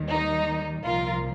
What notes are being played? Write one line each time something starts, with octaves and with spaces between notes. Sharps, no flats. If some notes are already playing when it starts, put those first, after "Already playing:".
Already playing: D#2 D#3 G3
D#4
C2 A#2 F3 F4 A#4